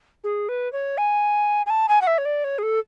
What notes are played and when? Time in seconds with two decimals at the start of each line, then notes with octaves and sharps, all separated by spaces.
0.24 G#4
0.49 B4
0.72 C#5
0.98 G#5
1.66 G#5
1.70 A5
1.88 G#5
2.01 F#5
2.07 E5
2.18 C#5
2.25 D5
2.44 C#5
2.58 G#4
2.63 A4